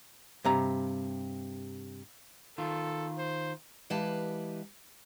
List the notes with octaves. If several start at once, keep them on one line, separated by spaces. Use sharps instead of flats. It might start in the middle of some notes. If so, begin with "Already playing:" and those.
G2 C3 A#5
D#3 F4 A4
C5
E3 G#3 G4 B4 F5 A5